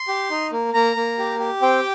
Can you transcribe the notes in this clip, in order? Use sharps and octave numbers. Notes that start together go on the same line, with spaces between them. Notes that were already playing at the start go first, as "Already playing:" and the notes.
Already playing: C6
G4
D#4
A#3
A#3 A#5
A#3
G4
G4
C4 G5